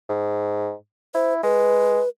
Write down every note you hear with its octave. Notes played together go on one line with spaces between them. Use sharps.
G#2
E4 C5
G#3 B4